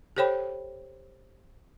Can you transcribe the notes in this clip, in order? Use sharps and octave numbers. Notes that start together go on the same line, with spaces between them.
G4 A4 C5 C#5 G5 B5